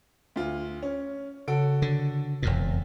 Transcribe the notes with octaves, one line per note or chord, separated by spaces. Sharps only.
D2 F4
C#4
C#3 F#4 A4 D7
D3
E1 F2 A#2